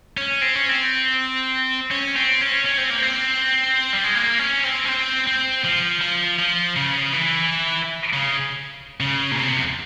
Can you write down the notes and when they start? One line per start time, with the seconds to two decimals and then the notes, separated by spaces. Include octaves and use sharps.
0.17 C#4
0.41 C4
0.55 C#4
0.69 C4
1.91 C#4
2.16 C4
2.41 C#4
2.65 C#4
2.77 C4
2.90 A#3
3.02 C4
3.93 G3
4.04 G#3
4.15 A#3
4.39 C#4
4.65 C4
4.86 C#4
4.89 C4
5.27 C4
5.64 F3
6.01 F3
6.39 F3
6.76 C#3
7.13 E3
8.13 C#3
9.00 C#3
9.31 A#2
9.37 C3
9.56 E2